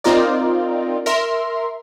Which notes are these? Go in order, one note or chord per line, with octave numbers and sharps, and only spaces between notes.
C4 D#4 F4 A#4 D5
A#4 E5 C6